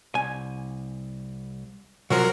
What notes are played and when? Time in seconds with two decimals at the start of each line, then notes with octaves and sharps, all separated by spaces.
0.15 C2 G#5
2.10 C3 F3 F#3 F#4 A#4